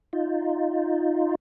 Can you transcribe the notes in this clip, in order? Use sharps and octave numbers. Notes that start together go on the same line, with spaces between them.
D#4 F4